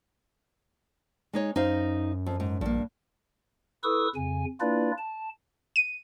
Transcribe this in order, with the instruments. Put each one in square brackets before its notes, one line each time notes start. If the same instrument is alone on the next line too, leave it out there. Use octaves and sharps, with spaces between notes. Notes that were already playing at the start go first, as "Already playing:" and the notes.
[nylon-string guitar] G#3 D#4 C#5
[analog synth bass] F#2 [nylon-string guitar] D#4 C5 F5
[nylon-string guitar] F2
G#2
[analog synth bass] A#1 [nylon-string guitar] G2 A#3
[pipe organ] E4 A4 B4 C#6 D#6 E6
F2 C#3 G#5
A#3 D4 E4 F4 B4 D5
A5
[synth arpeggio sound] D#7